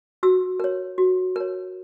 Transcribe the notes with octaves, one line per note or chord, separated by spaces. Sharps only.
F#4 E6
A#4 C#5
F#4
A#4 C#5